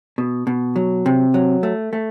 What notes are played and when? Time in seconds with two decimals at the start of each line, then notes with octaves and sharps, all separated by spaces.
0.18 B2
0.47 B2
0.76 F#3
1.06 C3
1.34 F#3
1.63 A3
1.93 A3